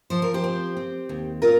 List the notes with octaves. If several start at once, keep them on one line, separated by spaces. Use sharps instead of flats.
F3 C5
A#4
G4 C5
C4
C4
D#2
A#2 F4 A#4